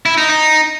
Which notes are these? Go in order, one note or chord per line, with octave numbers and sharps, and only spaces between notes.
E4
D#4
D#4